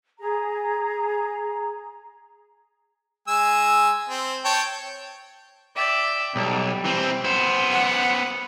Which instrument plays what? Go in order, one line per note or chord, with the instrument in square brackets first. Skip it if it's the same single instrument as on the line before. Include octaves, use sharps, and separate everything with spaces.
[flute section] G#4 A#5
[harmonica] G#3 G#5 E6
C4
C#5 G5 A5
[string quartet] D5 E5 G5
[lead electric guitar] B1 [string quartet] G3
[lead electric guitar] E3 C4
B3 C5
[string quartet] F#5